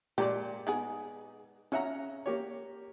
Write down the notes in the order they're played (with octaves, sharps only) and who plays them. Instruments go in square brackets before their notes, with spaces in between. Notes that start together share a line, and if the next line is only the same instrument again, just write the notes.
[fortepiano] A#2 G#3 F4 [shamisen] G4 A#4 D5
[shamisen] G#3 B3 G#4 [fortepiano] D#4
[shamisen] C#3 E5 [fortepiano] C#4 F#5 A#5
[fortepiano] A#3 G4 C#5